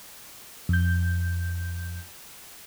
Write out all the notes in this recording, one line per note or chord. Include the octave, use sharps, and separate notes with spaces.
F2 G6